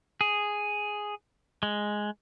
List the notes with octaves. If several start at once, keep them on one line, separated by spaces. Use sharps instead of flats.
G#4
G#3